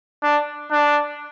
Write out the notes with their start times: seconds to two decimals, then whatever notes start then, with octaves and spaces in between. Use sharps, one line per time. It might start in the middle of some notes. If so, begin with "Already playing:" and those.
0.23 D4
0.71 D4